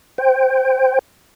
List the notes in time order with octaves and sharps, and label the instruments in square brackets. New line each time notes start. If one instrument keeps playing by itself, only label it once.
[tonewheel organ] C5 G5